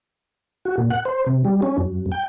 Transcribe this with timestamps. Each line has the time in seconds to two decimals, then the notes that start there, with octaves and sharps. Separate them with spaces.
0.65 F#4
0.78 A#2
0.90 F#5
1.05 C5
1.26 C3
1.45 G3
1.62 C#4
1.78 F#2
2.12 G5